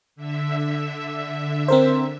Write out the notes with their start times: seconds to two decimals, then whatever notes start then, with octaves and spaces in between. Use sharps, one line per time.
0.16 D3 E5
1.68 C4 A#4 C5